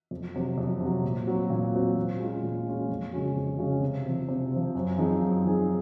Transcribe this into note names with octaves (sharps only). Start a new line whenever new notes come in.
F2
C3 F#3
F2
C3 F#3
A#2
F#3 C4 F#4
A#2
F#3 C4 F#4
A#2
G#3 C#4 F4
A#2
G#3 C#4 F4
F2
C#3 G#3 C#4 F#4
F2
C#3 G#3 C#4 F#4
C3
F3 C4
C3
F3 C4
F#2
F3 C4 D#4 G#4
F#2
F3 C4 D#4 G#4